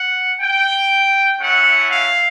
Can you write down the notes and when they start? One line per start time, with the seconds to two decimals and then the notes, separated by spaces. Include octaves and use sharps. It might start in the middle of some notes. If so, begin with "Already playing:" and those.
Already playing: F#5
0.41 G5
1.40 A3 C#4 E4 F#5
1.89 F5